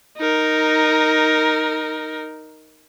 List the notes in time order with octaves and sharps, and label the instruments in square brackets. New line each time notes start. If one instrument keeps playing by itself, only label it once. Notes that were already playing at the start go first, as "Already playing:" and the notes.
[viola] D#4 A#4